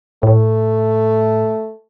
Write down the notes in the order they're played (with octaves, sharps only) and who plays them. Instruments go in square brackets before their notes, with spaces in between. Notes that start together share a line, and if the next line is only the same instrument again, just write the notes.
[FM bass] A2 [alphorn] A3